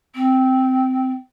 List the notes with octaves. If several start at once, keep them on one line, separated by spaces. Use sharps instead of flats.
C4